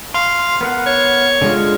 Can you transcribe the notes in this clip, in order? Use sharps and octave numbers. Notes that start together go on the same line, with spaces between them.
F5 C6
B3 A#4 F#5
C#5
D3 G#3 F4